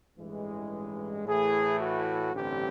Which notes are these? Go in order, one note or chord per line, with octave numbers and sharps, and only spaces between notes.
A1 G2 E3 G#3
A2 E3 A3 G#4
F#4
A1 G2 D3 G3 C4 G4